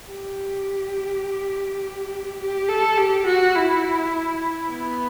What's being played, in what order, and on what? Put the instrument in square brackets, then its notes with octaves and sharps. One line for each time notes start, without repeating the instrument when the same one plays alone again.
[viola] G4
G4
A4
G4
F#4
E4
B3